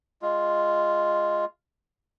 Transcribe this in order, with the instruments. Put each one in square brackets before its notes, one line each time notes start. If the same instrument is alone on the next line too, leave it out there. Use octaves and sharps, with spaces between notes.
[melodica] G#3 F4